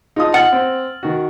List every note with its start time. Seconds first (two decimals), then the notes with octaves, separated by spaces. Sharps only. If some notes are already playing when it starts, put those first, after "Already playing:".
0.16 D#4 F4 G#4 A5 D#6
0.34 F#5 F6 A6 F#7
0.52 C4
1.03 D#3 F#4